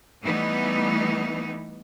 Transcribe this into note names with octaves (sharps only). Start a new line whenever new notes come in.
E3 G3 A3 B3 D#4